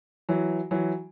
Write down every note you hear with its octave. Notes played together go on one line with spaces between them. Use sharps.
E3 F#3
E3 F#3